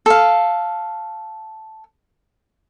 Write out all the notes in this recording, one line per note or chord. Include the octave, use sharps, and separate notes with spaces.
A4 F5